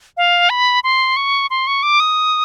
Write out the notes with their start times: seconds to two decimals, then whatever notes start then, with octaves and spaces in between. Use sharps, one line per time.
0.17 F5
0.50 B5
0.84 C6
1.16 C#6
1.50 C6
1.67 C#6
1.83 D6
2.00 D#6